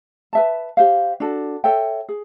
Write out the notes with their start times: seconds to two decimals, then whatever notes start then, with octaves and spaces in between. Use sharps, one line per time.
0.33 B4 E5 A5
0.77 G4 C5 F5
1.20 D4 F#4 A4
1.64 A4 C#5 E5 G5
2.09 G#4